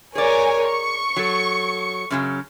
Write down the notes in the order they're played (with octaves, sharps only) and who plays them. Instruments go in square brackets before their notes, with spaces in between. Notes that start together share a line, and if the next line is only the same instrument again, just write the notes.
[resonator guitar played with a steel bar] G#4 D5 [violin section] A#4 C#5 G#5
[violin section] C#6
[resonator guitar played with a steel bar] F#3 A4
F#2 C#3 F#3